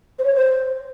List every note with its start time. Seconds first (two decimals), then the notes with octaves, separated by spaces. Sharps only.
0.19 C5
0.24 C#5
0.35 C5